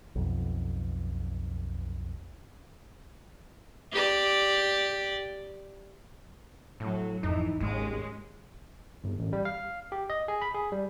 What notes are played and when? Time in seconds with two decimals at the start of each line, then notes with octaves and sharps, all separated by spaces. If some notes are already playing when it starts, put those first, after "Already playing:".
0.15 B1 F2
3.92 G4 D5
6.80 A2 F#3
7.23 G#1 F2 E3 D#4
7.60 G#1 D#2 G#2 G#3 C#4
9.04 G1
9.19 A1
9.33 G3
9.45 F5
9.92 G4
10.10 D#5
10.28 G#4
10.42 B5
10.55 G#4
10.72 G3